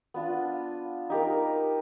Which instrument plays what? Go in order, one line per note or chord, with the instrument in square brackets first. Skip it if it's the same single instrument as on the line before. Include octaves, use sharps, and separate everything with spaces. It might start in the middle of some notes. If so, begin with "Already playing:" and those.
[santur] B3 D4 F4
D#4 G4 A#4